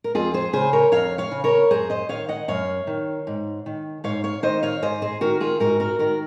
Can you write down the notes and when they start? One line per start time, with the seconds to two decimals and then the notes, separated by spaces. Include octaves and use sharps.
0.04 A#4
0.15 F2 F4 G#4
0.34 G#4 C5
0.53 C#3 G#4 C5
0.73 A#4 C#5
0.92 F2 C#5 F5
1.18 C#5 F5
1.31 C#3
1.44 A#4 C#5
1.71 F#2 G#4 C5
1.90 C5 D#5
2.09 D#3 C#5 F5
2.29 D#5 F#5
2.48 F#2 C#5 F5
2.87 D#3
3.27 G#2
3.66 D#3
4.04 G#2 C#5 F5
4.24 C#5 F5
4.43 D#3 C5 D#5
4.63 C#5 F5
4.82 G#2 C5 D#5
5.02 G#4 C5
5.21 D#3 F#4 A#4
5.41 F4 G#4
5.60 G#2 F#4 A#4
5.80 F#4 A#4
5.99 D#3 F#4 A#4